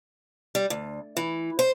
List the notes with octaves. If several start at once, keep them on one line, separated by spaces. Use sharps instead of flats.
G3
D2
E3
C5